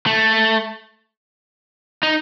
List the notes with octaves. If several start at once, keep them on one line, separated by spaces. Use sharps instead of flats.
A3
D#4